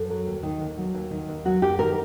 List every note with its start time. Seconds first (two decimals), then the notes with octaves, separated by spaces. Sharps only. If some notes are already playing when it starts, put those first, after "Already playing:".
Already playing: F#2 A4
0.10 F#3
0.27 D#2
0.43 D#3
0.61 D#2
0.77 F#3
0.95 D#2
1.11 D#3
1.29 D#2
1.45 F#3 F#4
1.62 F#2 G4
1.79 D#3 A#4